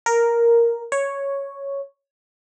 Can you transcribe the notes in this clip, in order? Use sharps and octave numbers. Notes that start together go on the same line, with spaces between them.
A#4
C#5